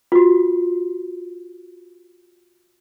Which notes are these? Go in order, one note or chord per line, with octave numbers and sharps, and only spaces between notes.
F4 F#4